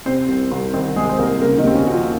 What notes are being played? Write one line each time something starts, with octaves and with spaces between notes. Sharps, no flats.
C3 C4 C5
C2
C2
D#3 C4 C5
C3 G#3 G#4
C5
C2 A#3 A#4
C#3 A#3 A#4
D#3 D#4
D#2 C4
C#3 C#4
A#3 F#4
F3 F4